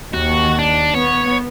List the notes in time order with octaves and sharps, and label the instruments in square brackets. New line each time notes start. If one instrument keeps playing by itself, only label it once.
[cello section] D#2 [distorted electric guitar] F#4
[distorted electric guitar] D4
[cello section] B3 [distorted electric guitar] C#5